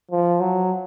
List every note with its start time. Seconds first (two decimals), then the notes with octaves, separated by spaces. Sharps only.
0.11 F3
0.40 F#3